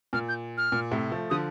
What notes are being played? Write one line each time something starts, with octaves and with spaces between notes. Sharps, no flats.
A#2 F6
G6
F6
A#2
A2 C3
F3 A3
D3 F3 D#6